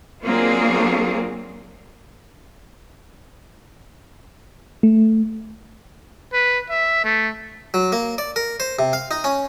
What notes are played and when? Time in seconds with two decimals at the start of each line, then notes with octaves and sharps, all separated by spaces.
0.23 F#3 A#3 C4 D4 F4 G#4
4.83 A3
6.33 B4
6.70 E5
7.04 A3
7.74 F#3
7.92 A#3
8.18 D5
8.36 A#4
8.60 C5
8.79 C3
8.93 F5
9.11 D#4
9.24 C#4